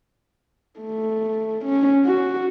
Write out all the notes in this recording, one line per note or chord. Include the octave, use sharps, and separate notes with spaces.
A3
C#4
F#4